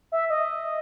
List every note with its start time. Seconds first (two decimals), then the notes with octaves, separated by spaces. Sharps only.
0.12 E5
0.30 D#5